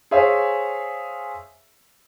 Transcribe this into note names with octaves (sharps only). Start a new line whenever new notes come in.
G#4 C5 C#5 E5 F5 G#5